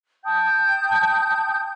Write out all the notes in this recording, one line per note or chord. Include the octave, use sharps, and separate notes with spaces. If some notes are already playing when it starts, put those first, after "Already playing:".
G5 A5 D#6 G6